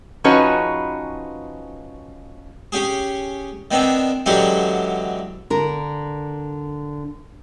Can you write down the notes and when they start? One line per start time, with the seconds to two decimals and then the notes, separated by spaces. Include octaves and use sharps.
0.24 F3 C#4 D#4 F#4 G#4 B4
2.72 C#4 G4 G#4
3.71 D#3 B3 C4 D4
4.26 D3 E3 F#3 G#3 C#4 G4
5.50 D3 A#4